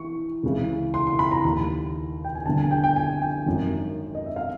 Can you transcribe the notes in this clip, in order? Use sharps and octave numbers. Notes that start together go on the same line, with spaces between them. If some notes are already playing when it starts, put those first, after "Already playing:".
Already playing: E3 C#6
C#2 C#3 E3
C6
C6
B5
A#5
D#2 D#3 B5
G5
G#5
G1 G2 D3 A5
G#5
G5
G5
G#5
G5
G#1 F#2 D#3
D#5
E5
F5